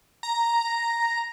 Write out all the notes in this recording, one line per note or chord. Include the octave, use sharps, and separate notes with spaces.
A#5